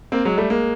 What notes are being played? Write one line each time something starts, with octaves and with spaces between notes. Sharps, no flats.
A#3 C4
F#3 G#3
G3 A3
G#3 A#3